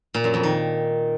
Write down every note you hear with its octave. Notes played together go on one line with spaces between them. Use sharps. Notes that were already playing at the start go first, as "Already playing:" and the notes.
A#2
F#2
F2
D#3